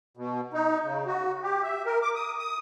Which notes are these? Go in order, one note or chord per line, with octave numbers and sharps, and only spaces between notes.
B2
D#4
C#3
F#4
G4
E5
A#4
D6
D#6
D#6